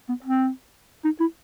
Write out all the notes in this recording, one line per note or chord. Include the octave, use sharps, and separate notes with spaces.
B3
C4
D#4
E4